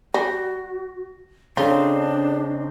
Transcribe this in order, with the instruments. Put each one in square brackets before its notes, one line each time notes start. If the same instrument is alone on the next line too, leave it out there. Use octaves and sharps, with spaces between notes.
[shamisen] G3 [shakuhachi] F#4 [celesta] A#6
[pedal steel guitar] C#3 C4 D#4 [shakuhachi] D4 [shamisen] F4 [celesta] G#4 A4 C#5